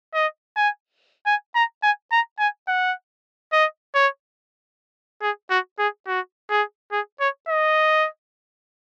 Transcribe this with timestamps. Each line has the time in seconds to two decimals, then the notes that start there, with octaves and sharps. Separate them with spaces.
0.14 D#5
0.56 G#5
1.26 G#5
1.55 A#5
1.83 G#5
2.12 A#5
2.39 G#5
2.68 F#5
3.53 D#5
3.95 C#5
5.22 G#4
5.50 F#4
5.79 G#4
6.07 F#4
6.50 G#4
6.92 G#4
7.20 C#5
7.48 D#5